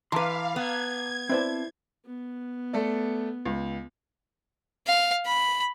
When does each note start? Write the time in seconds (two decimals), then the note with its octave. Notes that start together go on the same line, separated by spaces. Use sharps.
0.12 E3 B4 F5 A5 A#5 C6 D6
0.56 B3 G#6
1.29 C4 E4 B4 C5 D5 A5
2.06 B3
2.73 A3 A4 D5
3.45 C#2
4.87 F5
5.26 B5